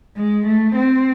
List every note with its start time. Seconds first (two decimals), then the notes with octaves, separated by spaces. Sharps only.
0.16 G#3
0.46 A3
0.75 C4